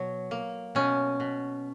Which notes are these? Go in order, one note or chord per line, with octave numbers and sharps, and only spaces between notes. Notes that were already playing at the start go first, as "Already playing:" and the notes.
Already playing: B2 F#3
A#3
B2 C#4
B2